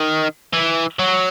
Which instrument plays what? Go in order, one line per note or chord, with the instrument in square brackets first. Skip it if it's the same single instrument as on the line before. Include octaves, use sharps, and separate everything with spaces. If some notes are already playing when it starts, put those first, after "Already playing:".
Already playing: [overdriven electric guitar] D#3
E3
F#3